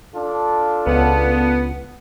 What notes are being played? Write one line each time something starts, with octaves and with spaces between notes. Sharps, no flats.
D4 F4 A4
C#2 B3